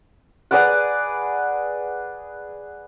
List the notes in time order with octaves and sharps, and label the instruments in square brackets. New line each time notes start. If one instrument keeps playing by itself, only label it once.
[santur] G#4 B4 D5 F#5